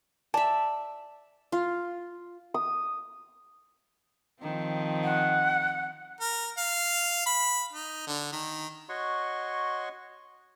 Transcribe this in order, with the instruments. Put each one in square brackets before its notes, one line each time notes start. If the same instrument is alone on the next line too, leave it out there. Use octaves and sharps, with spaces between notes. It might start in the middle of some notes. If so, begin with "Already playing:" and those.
[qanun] D5 E5 [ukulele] A5
[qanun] F4
[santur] D#6
[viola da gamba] D#3 F3 C4
[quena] F#5
[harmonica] A#4
F5
B5
D#4
D3
D#3
[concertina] F#4 C#5 D#5 F#5 C6 C#6